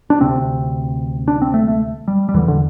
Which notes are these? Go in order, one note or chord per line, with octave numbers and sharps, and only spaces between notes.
D4
D2 C3 C4
D4
C4
A3
A3
G3
G3
E2 D3 E3
D3